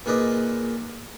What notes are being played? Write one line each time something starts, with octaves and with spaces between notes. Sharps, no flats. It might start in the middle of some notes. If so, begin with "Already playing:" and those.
A#2 D#4 G#4 B4 D5 D#5